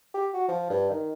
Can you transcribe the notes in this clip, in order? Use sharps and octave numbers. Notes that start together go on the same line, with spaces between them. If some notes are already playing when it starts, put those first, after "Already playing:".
G4
F#4
F3
G2
D#3